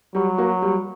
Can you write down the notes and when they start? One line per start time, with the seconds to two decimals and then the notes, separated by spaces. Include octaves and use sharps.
0.14 F#3 G3
0.38 A#3 F#4
0.62 G3